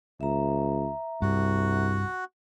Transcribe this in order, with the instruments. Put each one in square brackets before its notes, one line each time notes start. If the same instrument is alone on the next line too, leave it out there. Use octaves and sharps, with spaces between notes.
[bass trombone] C#2 [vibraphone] E5 A#5
[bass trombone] C2 [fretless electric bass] G2 [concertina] F#4 F#5